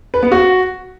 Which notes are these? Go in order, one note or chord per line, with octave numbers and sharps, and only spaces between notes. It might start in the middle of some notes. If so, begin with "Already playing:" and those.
B4
B3
F#4